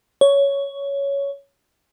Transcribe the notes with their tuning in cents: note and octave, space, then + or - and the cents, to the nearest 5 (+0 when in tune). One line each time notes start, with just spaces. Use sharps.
C#5 +10